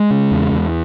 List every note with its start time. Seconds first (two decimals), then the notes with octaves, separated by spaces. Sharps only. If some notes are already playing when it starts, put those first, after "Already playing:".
Already playing: G#3
0.11 C#3
0.31 E2
0.52 E2